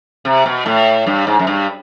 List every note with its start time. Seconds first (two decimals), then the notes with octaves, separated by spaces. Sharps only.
0.25 C3
0.46 B2
0.66 A2
1.06 G2
1.27 G#2
1.39 F#2
1.47 G2